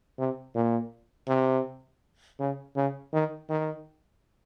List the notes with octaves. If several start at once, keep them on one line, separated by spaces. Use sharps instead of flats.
C3
A#2
C3
C#3
C#3
D#3
D#3